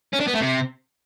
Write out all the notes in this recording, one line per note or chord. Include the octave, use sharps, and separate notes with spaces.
C#4
D4
B3
A3
C3